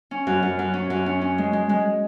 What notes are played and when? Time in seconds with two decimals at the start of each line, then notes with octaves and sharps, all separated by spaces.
0.11 C#4
0.27 F#2
0.43 F#2
0.59 F#2
0.74 C#4
0.90 F#2
1.06 C#4
1.21 C#4
1.38 G#3
1.53 G#3
1.69 G#3